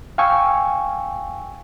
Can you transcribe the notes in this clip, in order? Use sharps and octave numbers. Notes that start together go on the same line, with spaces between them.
F5 G5 G#5 C#6 E6